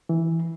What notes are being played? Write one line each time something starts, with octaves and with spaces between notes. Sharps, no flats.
E3